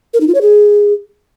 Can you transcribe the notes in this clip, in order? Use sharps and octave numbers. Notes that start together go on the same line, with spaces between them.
A#4
D#4
F4
C#5
G#4